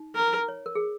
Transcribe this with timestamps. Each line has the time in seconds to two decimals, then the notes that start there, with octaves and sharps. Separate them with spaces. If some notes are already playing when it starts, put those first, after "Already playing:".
Already playing: D#4
0.15 A#4
0.49 C#5
0.66 A#4
0.75 G#4